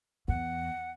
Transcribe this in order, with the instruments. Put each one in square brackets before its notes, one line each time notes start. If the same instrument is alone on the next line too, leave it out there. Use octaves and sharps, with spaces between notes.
[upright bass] E2 [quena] F#5